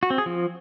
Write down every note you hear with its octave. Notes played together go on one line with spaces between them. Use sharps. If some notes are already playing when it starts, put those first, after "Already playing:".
F#4
C4
G#4
F3